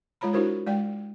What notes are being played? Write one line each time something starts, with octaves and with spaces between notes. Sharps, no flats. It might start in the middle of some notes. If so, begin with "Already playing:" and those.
G#3 F4 C#5 A#5 B5
D4 E4 F#4 A#4 C5
G#3 D5 G5